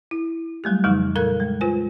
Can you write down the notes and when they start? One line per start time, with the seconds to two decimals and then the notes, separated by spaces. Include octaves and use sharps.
0.11 E4
0.64 F#3 G3 A3 G4
0.84 F2 C#3 E3 F3 G3 D#4
1.16 A#2 A4 A#4 F5 F#6
1.40 G#3
1.61 F4 B4 C5 G#5